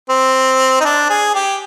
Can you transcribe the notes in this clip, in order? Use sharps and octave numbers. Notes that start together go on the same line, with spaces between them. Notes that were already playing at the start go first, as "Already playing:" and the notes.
C4
D#4
D4
G#4
G4